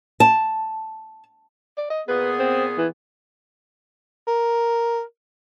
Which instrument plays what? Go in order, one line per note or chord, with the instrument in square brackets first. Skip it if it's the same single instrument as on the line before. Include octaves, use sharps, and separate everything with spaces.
[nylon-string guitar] A5
[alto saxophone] D5
D#5
[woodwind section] A#2 B3 G#4 [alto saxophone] B4
[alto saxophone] C4
E3
[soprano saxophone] A#4